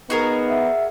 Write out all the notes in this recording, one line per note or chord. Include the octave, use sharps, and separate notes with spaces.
B3 D#4 F#4 G#4 A#4
E5